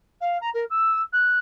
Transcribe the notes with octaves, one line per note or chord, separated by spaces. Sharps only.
F5
A#5
A#4
E6
F#6